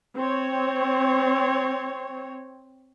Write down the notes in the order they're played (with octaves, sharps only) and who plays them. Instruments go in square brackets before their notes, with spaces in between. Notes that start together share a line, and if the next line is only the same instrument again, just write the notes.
[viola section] C4 C#5